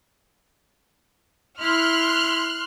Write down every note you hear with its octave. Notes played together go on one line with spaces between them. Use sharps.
E4 C6 F6 F#6